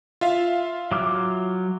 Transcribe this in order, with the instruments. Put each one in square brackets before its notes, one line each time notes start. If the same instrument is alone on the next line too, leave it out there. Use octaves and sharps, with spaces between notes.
[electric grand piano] F4 E5 F5
[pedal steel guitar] F#3 D6 F6